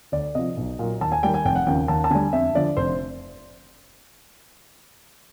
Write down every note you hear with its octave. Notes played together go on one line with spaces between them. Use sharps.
D2 D5
C3 F3 D#5
B1
A#2 F#3
D#2 A5
G#5
D#3 G3 G5
G#5
F1 G5
F#5
D#2 C#3 F3 G5
D#2 A5
A5
D3 G3 G#5
F2 E5
D3 F3 D5
F1 C5